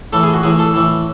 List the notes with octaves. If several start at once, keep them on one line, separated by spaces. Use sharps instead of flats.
A2 E3 A4
G#4
F#4
A2 E3 G#4
A4
A2 E3